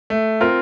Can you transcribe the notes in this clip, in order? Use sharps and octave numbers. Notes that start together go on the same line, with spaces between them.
A3
C4 F4 A#4